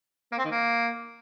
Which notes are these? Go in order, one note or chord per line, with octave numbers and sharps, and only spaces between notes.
A#3
C4
D#3
A#3